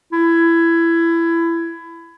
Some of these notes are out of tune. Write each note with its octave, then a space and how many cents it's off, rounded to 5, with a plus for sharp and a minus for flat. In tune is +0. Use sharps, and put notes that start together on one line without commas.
E4 +20